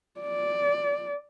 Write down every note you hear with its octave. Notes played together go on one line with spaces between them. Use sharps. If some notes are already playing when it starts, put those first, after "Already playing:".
D5